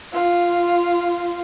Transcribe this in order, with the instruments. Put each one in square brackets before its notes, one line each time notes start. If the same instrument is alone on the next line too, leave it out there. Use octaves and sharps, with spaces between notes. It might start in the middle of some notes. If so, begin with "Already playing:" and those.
[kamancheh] F4